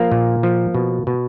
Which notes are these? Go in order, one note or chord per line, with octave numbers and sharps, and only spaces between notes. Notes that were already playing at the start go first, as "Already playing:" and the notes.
Already playing: F3 A#3
A#2
F3
B2
B2